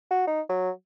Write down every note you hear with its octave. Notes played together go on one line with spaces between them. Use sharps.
F#4
D#4
F#3